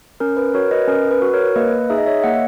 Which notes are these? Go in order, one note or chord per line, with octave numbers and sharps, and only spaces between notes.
C#4 A#4
B4
F#4 A#4 C#5
B4 D#5
C#4 A#4
B4
F#4
A#4 C#5
A#3 B4 D#5
D#4 G#4 E5
D#5
C#5 E5
A#3 D#5 F#5